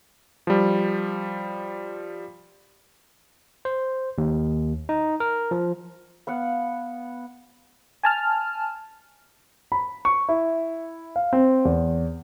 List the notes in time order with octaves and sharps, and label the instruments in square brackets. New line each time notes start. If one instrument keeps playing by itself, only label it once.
[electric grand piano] F3 G3
[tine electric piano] C5
D#2
D#4
A#4
F3
[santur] B3 F5 F#5
[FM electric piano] G#5 A5 F6
[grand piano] B5
C#6
E4
F5
C4
E2